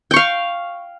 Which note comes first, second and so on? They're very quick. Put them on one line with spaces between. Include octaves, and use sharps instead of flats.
G5 C#6 F5